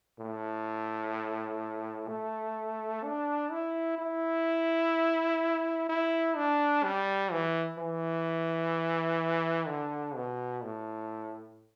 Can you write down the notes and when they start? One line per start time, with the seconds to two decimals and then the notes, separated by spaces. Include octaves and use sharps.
0.19 A2
2.08 A3
3.04 D4
3.51 E4
3.98 E4
5.89 E4
6.36 D4
6.84 G3
7.32 E3
7.78 E3
9.68 D3
10.15 B2
10.63 A2